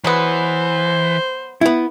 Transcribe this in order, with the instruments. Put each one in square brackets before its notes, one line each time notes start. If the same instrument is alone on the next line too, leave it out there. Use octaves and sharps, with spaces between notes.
[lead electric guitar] E3 [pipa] F#3 G#3 B3 [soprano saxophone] C5
[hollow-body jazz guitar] B3 E4